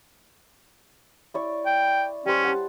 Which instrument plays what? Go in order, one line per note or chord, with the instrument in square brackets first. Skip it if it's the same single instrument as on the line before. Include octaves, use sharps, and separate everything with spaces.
[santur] E4 D5 C#6
[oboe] G5
[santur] G3 C5 [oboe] C#4
[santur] F#5 A5